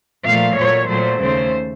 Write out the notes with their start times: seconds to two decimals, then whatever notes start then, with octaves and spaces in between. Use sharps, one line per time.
0.25 A#2 F3 A3 F5
0.57 A#2 F#3 A3 C#5
0.89 A#2 F#3 A3 C5
1.20 D#2 C#3 A3 C5